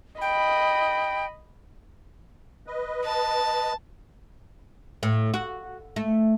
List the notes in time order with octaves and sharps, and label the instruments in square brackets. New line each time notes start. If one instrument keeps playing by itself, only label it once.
[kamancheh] D#5 B5 [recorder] G5
[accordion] B4 D#5
[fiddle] A5
[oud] A2
F#4
A3